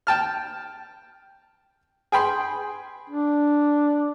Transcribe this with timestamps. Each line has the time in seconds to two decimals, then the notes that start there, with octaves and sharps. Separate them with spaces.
0.07 G5 A5 F6
2.12 G#4 G5 B5 C6
3.10 D4